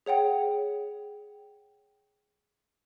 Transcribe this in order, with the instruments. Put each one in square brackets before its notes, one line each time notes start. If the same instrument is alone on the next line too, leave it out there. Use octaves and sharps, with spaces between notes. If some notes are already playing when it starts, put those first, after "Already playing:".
[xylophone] G#4 C#5 F#5 G5